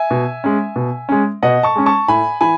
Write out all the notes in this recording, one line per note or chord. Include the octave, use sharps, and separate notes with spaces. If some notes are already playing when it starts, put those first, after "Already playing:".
Already playing: E5 G#5
B2
G#3 C#4
B2
G#3 C#4
B2 D#5 F#5
A5 C#6
G#3 C#4
A5 C#6
A2 G#5 B5
E3 G#5 B5